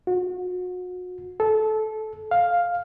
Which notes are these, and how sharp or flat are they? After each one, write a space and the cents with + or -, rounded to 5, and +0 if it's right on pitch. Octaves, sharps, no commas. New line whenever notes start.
F#4 -35
A4 -20
F5 +5